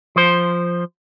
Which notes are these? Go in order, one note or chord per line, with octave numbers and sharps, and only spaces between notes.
F3 C5